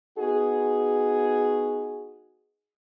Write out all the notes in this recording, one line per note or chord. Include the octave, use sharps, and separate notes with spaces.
B3 D#4 F#4 G#4